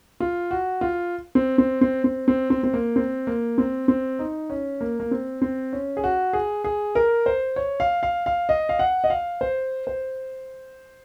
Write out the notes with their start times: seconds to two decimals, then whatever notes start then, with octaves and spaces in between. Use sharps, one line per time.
0.20 F4
0.51 F#4
0.81 F4
1.35 C4
1.58 C4
1.81 C4
2.04 C4
2.28 C4
2.50 C4
2.64 C4
2.73 A#3
2.96 C4
3.27 A#3
3.58 C4
3.88 C4
4.19 D#4
4.50 C#4
4.81 A#3
5.00 A#3
5.11 C4
5.42 C4
5.73 C#4
5.97 G#4
6.04 F#4
6.33 G#4
6.64 G#4
6.95 A#4
7.26 C5
7.56 C#5
7.80 F5
8.03 F5
8.26 F5
8.49 D#5
8.69 F5
8.79 F#5
9.04 D#5
9.10 F5
9.41 C5
9.87 C5